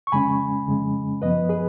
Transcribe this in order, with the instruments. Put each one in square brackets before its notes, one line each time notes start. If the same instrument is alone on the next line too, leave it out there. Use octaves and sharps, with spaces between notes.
[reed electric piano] C#6
F2 C#3 G#3 C#4 G#5 B5
F2 C#3 G#3 C#4
F#2 F3 B3 B4 D#5
G#4 B4